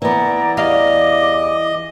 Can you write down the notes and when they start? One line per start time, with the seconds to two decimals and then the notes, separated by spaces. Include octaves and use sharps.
0.02 E3 B3 D5 A#5
0.57 E2 G3 D#5 F5 D6